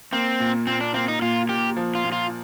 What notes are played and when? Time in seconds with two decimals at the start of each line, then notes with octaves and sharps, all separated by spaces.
0.12 A#3 C4
0.40 A#2
0.67 A#2 C4
0.81 D4
0.94 A#3 C4
1.08 D#4
1.22 A#2 F4
1.49 A#2 G4
1.77 F3
1.95 F4
2.04 A#2
2.12 F4